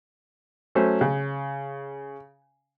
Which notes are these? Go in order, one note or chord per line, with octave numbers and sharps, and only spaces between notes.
F#3 A3 C#4 C5
C#3